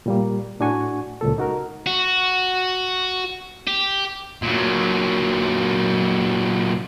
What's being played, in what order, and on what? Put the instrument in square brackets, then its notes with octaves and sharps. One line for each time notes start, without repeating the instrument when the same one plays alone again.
[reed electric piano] A#2 G3 A#3
A2 D4 F#4 G#5 C#6
C#2 A#2 A4
D#4 F#4 A#4
[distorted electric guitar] F#4
G4
A#2 F#3